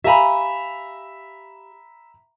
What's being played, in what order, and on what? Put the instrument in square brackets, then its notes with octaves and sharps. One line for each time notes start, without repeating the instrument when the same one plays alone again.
[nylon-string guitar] G4 F5 G#5 [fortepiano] E5 A#5 B5